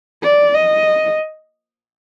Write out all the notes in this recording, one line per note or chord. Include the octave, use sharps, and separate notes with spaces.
D5
D#5